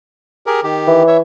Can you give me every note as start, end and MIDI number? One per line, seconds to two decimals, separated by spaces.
0.47 0.61 67
0.47 0.61 68
0.47 0.61 70
0.64 1.03 51
0.64 1.03 67
0.87 1.20 52
1.07 1.17 73
1.07 1.17 76